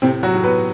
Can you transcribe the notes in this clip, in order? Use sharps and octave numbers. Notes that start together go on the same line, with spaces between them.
A2 C3 C4
F#3 F#4
A2
B3 B4